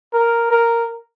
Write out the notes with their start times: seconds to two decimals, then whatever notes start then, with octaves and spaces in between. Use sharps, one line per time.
0.13 A#4
0.51 A#4